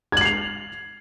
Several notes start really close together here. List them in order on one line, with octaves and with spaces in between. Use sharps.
G#6 F#7 C7 F7